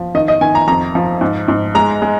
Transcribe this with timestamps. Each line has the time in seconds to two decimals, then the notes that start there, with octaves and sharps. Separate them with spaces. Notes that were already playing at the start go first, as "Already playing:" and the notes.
Already playing: F3
0.15 D#3 D#5
0.28 D#5
0.41 D#3 G#5
0.55 A#5
0.68 F2 A#5
0.95 F3
1.21 G#2
1.48 G#2
1.75 G#3 A#5
2.02 G#3